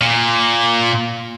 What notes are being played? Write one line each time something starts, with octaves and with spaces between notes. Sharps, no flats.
A#2